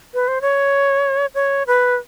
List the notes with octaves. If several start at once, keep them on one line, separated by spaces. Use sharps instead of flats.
B4
C5
C#5
C#5
B4